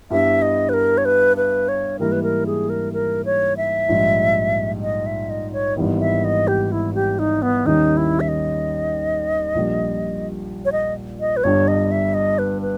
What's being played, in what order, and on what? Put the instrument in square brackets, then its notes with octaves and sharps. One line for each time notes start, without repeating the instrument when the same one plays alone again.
[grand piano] G2 G3 B3 E4 G4 [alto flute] E5
[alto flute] D#5
B4
A#4
C#5
B4
B4
C#5
[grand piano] G#2 E3 G3 A#3 E4 [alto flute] A#4
[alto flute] B4
A#4
G#4
A#4
A#4
C#5
E5
[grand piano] A#1 G#2 G3
[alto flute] D#5
E5
D#5
C#5
[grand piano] G#1 G#2 E3 G3 B3
[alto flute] E5
D#5
G4
E4
G4
D#4
B3
[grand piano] D#2 D#3 G3 C#4 [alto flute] D#4
[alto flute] E4
E5
D#5
[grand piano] A#1 A#2 G3
[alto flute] C#5
D#5
D#5
B4
[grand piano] G1 G2 G3 [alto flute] C#5
[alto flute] D#5
E5
D#5
B4
B4